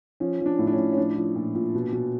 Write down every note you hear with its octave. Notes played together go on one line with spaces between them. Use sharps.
F3 C#4
F3
D4
A2
D4
C#4
A2
C#4
F3 D4
F3
A#2
A#2
B2
B2